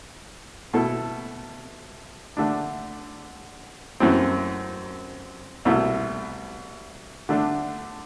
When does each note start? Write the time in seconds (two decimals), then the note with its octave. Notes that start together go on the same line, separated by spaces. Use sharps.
0.73 B2 A3 E4 A4
2.37 D3 A3 D4
4.00 F#2 E3 A3 C4
5.65 C2 B2 A3 E4
7.29 D3 A3 D4